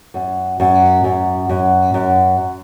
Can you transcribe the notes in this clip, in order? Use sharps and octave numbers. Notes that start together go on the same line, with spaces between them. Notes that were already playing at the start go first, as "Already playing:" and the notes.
F#2
F#2
F#2
F#2
F#2